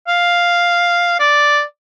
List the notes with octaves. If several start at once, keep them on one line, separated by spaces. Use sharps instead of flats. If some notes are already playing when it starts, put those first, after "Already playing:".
F5
D5